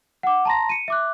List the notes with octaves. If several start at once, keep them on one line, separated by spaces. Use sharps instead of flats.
F#5 D6
A5 A#5 C6 A#6
C#7 D#7
E5 D6 F#6